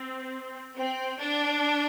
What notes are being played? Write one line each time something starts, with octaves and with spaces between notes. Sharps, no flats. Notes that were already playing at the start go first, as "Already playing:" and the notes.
Already playing: C4
C4
D4